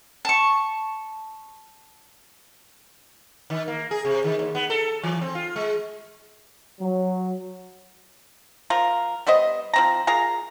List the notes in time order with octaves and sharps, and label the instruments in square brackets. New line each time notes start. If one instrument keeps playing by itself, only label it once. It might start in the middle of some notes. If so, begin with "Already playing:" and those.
[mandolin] A5 C#6
[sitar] D#3
A#3
G#4
C3
D#3
D#2
B3
A4
E3
C4
F4
G#3
[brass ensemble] F#3
[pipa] F3 F4 A#4
G3 B3 C5 D#5
F3 C4 A#5
F4 G#4 A#4 A#5